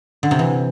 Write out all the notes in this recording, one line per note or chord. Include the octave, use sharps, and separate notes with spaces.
D3
C3
E3